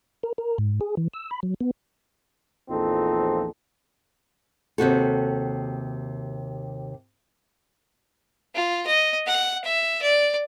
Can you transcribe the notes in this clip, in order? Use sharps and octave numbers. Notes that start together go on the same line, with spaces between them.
A#4
A#4
G#2
G#4
E3
E6
B5
F#3
B3
A#1 E2 F3 C4 D#4 A4
D#2 C3 F#4 A4
F4
D#5
F#5
E5
D5